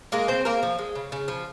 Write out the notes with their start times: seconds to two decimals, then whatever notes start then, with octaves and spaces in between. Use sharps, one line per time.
0.12 G#3 A#3 A#4
0.28 C#3 C4 C5
0.45 C#3 A#3 A#4
0.63 F3
0.79 G#3
0.95 C#3
1.12 C#3
1.28 F3